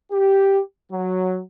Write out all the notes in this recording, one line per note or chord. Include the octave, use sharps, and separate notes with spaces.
G4
F#3